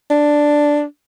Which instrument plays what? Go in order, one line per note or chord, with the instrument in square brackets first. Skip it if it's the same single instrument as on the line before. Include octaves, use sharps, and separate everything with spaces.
[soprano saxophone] D4